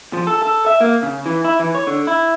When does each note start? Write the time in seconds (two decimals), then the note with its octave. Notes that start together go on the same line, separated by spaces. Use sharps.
0.13 F3
0.27 A4
0.43 A4
0.66 E5
0.81 A#3
1.03 C#3
1.26 E3
1.45 E4
1.60 E3
1.75 C#5
1.87 D3
2.07 E4